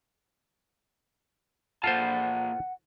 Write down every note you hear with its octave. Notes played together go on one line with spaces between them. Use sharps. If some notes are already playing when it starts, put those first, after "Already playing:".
A#2 F4 A4 C5 F#5 A5